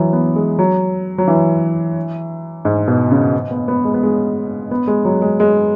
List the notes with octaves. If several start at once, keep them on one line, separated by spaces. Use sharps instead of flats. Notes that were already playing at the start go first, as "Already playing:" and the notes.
Already playing: E3 F#3
B3
G#3
F#3
F#3
E3
G#2
B2
C#3
B3
B3
G#3
B3
G#3
B3
G#3
F#3
G#3
G#3